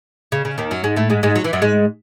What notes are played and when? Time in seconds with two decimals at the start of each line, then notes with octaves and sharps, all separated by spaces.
0.32 C#3
0.45 C#3
0.58 D#2 D#3
0.71 F#2 F#3
0.84 G#2 G#3
0.96 A2 A3
1.10 G#2 G#3
1.23 G#2 G#3
1.35 F#3
1.44 E3
1.53 F#2 F#3
1.62 G#2 G#3